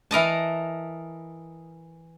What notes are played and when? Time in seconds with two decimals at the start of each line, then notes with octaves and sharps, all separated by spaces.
0.11 E3 A#4 D#5 A5